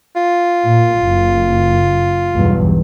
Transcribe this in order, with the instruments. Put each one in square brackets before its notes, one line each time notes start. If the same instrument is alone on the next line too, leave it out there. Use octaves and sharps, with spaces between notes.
[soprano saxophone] F4
[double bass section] A#2
F#1
B1 E2 G2